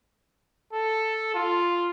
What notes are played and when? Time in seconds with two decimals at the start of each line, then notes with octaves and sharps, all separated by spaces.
0.73 A4
1.34 F4